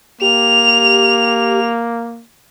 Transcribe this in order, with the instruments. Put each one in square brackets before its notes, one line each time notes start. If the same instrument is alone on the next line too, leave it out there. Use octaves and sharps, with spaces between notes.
[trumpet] A#3 [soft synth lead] G4 [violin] F7